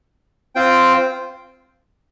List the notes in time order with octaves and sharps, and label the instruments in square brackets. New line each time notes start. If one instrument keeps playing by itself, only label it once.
[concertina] C4 F4 C5 G5